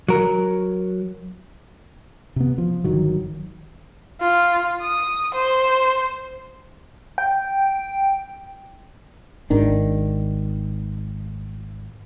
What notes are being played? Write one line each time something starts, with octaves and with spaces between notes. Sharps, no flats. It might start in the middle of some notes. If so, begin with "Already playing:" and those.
F#3 A#4
C3 B3
F3
G1 D#3 F#3
F4
D#6
C5
G5
G#1 D#3 D4